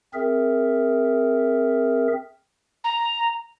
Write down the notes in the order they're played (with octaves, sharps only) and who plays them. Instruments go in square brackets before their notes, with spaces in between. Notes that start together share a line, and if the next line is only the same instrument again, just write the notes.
[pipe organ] C4 G#4 A#4 E5
[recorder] A#5